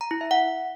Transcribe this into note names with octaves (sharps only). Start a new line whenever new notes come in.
A#5
E4
E5
F#5